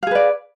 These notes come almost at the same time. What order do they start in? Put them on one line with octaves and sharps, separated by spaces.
F5 G#4 B4 D5